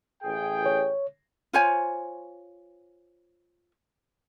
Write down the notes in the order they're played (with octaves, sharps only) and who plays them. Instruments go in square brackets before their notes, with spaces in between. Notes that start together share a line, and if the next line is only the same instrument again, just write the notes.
[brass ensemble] A1 G#4 G5
[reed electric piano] C#5
[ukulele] F4 C5 C#5 G#5